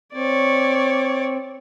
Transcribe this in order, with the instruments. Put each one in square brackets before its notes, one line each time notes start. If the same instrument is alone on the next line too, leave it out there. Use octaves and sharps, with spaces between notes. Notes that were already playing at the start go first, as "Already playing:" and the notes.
[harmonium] C4 [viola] C#5 D5